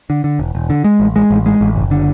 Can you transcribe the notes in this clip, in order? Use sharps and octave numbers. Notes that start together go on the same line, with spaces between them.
D3
D3
E1
E1
D3
G#3
A1
G#3
A1
G#3
A1
F#1
D3